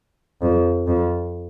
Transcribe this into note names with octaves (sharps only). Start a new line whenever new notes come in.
F2
F2